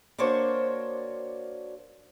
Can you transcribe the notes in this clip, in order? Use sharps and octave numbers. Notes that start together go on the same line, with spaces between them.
A#3 D4 F#4 C5 C#5